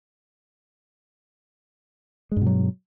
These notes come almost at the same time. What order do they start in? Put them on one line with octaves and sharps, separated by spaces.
G#3 G2 B2 F#3